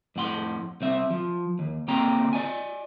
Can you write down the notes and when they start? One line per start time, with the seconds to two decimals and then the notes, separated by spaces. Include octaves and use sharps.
0.16 F2 A2 F#5 C6
0.81 C2 C4 E5
1.10 F3
1.59 D#2
1.88 C#3 A#3 C4 G5 A#5
2.33 D5 D#5 G#5